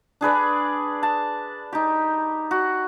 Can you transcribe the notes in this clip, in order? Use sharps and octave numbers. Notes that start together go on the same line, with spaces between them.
D4 G#4 B4 D5
A5
D#4 G4
F#4